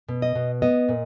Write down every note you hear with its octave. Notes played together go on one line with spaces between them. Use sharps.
B2
D#5
B2
B3 D#5
A#2